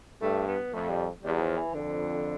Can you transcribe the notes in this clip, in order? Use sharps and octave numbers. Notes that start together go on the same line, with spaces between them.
G2 A3
B3
F2 A3
G3
E2 G3
F3
E3
F2 D3